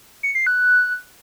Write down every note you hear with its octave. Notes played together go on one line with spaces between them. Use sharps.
C#7
C7
F#6